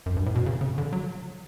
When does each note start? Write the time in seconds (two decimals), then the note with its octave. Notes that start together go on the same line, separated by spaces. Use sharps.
0.06 F#2
0.17 G2
0.26 A2
0.35 B2
0.46 C#3
0.61 C#3
0.78 D3
0.93 F#3